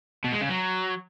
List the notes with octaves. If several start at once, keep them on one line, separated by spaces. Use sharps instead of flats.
B2
G#3
C#3
F#3